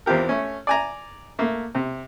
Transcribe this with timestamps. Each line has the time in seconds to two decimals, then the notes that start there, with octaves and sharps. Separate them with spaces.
0.06 E2 C4 F4 G4 A#4
0.29 A3 C#4
0.67 D5 G#5 A#5
1.39 A3 A#3
1.75 C3